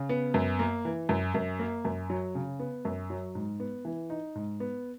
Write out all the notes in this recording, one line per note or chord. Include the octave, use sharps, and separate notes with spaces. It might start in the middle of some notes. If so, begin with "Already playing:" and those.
Already playing: C#3
B3
F#2
A#3
E3
F#2
F#2
A#3
F#2
F#3
C#3
B3
F#2
F#3
G#2
B3
E3
D#4
G#2
B3